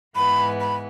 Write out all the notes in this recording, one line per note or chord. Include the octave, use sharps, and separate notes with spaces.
G#2 E3 B3 B5
B5